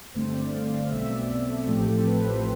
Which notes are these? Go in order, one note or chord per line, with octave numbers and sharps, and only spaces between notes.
G1 G2 D3 A3 C4 C5
D5
F5
F5
B1 B2 A3 C4 E5
D5
A4
A1 A2 F3 A3 C4 G4
A4
B4
C5